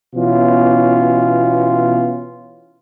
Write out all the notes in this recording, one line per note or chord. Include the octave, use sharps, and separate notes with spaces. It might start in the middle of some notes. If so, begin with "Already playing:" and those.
B2 E3 B3 C#4 F4